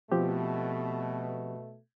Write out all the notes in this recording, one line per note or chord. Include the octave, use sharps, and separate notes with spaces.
B2 F3 A3 C4 G4